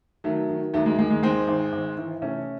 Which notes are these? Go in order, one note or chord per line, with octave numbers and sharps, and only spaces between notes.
D#3 F#3 A3
D#3
D#2 F#3 A3
G#3
D#2 G#3
G#3
G#2 G#3 C4
G#1
G#1
E3
C3 A3 C#4